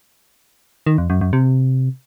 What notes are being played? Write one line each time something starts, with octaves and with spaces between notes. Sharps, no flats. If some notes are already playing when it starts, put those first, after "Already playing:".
D#3
F2
F#2
F#2
C3